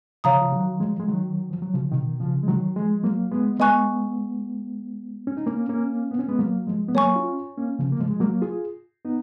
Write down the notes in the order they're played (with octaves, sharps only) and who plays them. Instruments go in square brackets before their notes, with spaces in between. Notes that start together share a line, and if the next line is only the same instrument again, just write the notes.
[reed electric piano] C#3 F3 [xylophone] C#5 F5 A#5 D#6
[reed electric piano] F3
D#3 F#3
F3 G#3
G#3
D#3 F#3
F3
F#3
C#3 F3
B2 D#3
C#3 F3
G#3
D#3 F#3
F3 G#3
F#3 A#3
G#3 B3
[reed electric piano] G#3 B3 [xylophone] D#5 G#5 C#6 F#6
[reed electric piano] C#4
D#4
A#3 C#4
A#3 C#4
B3
C#4
G#3 B3
F#3 A#3
F3 G#3
B3
[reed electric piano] F#3 A#3 [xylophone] C#5 G#5 C#6
[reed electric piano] C#4 F4
A#3 C#4
C#3 F3
A#3
F3 G#3
G#3
F#3 A#3
F4 G#4
B3 D#4